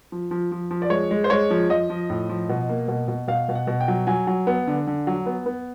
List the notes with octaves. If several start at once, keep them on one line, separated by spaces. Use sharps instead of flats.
F3
F3
F3
F3
D5
G#3 C#5
G#3
C5
G#3 C#5
F3
F3 D#5
F3
A2
F3
B2
A#3
B2
B2
B2 F5
B2
F#5
B2
G5
F#3
F#3 G#5
F#3
B3
D3
D3
F#3
B3
B3